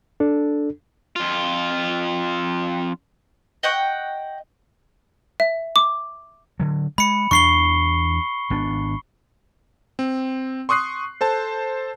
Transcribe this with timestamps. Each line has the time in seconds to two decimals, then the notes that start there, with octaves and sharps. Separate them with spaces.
0.20 D4 A4
1.16 F2 F4
3.63 D#5 F#5 G5 C#6
5.40 E5
5.76 D6
6.60 D3 F#3
6.98 G#3 B5 C#7
7.31 E2 E3 D4 C#6 C7 G7
8.50 G#1 B3 D4
9.99 C4
10.69 C6 C#6 D#6 F#6 C7
11.21 A4 C5 A5